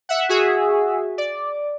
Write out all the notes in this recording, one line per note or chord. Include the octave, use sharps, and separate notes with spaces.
E5 F#5
F#4 G#4 E5
D5